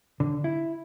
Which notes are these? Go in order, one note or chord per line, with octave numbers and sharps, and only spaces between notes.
D3
E4